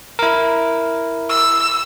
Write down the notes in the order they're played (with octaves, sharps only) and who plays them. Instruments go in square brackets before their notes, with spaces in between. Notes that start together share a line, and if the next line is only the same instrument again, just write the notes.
[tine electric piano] E4 A#4
[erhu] E6